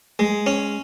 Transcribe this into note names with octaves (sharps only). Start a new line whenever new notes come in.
G#3
C#4